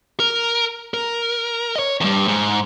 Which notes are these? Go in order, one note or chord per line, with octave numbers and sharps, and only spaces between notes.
A#4
A#4
C#5 D#5
E2 G2
G#2